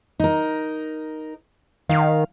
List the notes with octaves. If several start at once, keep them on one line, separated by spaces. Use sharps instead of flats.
D#4 A#4
D#3 F5